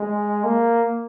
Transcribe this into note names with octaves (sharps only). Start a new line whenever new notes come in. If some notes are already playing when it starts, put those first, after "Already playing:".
Already playing: G#3
A#3